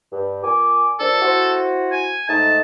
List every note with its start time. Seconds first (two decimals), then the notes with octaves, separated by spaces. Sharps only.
0.12 G2
0.43 A#2 G#5 D6
0.99 A#2 F3 D4 A4
1.22 E4 F#4 C5
1.92 G#5
2.29 G#2 A3 D#4 A5